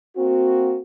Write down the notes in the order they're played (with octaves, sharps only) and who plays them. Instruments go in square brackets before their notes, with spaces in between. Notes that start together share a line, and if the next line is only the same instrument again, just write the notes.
[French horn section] A#3 C4 F#4